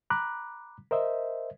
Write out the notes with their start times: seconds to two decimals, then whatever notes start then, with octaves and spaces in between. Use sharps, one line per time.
0.10 A#5 B5 D6 F#6
0.91 A#4 C5 D#5 E5